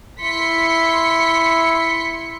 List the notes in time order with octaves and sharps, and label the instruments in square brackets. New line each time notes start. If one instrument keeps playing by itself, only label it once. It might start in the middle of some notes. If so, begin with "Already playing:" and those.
[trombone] E4 [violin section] C6 B6 C#7